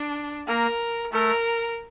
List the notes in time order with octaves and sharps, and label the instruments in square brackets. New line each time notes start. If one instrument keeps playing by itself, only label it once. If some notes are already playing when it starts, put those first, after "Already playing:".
Already playing: [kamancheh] D4
[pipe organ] A#3 [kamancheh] A#4
[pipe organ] A3 [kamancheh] A#4